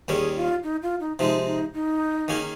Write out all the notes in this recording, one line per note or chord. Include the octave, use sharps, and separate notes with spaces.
D#2 D#3 G3 C#4 G#4
F4
D#4
F4
D#4
C3 F3 G#3 D#4
D#4
D#4
D#3 A#3 C#4 G#4